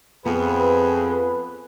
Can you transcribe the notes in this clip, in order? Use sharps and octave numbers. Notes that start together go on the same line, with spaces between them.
F2 B3 G#4 B4